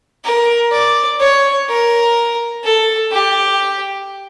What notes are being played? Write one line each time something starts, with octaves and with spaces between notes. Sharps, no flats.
A#4
D5
C#5
A#4
A4
G4